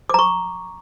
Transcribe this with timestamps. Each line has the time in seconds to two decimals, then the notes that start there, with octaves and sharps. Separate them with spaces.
0.10 D6
0.14 A#5
0.19 C#6